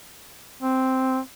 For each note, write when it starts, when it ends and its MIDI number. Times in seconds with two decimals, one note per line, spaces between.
0.63 1.19 60